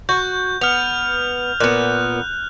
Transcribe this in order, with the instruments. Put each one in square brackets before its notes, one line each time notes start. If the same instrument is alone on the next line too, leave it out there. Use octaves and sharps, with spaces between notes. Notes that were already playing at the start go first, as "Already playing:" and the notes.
[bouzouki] F#4 [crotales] G6
[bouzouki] B3 [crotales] F6 F7
[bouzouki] A#2 B3 [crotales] F#6